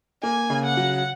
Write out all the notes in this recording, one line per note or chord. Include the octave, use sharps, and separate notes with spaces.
A#3 G#5
C#3
F#5
F#3